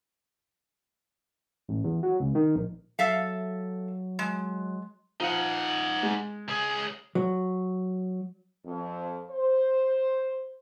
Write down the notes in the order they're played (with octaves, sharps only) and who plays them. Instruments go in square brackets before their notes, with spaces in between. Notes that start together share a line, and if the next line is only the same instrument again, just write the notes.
[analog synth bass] A1
E2
F#3
C#2
D#3
A#1
[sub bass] F#3 [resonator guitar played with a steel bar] A4 E5 F5
[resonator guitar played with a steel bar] G#3
[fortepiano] F3 F4 [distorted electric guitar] D#4 F#5
[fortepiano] G#3
[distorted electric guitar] C#2 G#4
[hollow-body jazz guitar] F#3
[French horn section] F2
C5